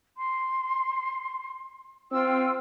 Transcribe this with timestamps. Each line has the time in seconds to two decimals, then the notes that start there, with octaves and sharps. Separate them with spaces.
0.17 C6
2.12 C4 F4 G5 E6